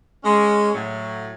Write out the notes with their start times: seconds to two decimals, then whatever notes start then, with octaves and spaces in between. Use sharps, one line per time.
0.24 G#3 C#4
0.75 A2 F#3